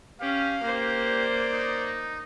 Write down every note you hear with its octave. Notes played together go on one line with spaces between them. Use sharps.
C#4 G4 F5
A#3 G4 C5
D5
D#4